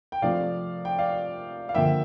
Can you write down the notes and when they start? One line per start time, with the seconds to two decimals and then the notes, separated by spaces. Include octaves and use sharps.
0.12 G5
0.22 C3 F3 A3 D5 F5
0.85 G5
0.99 D5 F5
1.69 F5
1.74 D3 F3 A#3 E5 G5